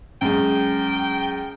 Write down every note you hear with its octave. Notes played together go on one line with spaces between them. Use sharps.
F#2 G#3 G5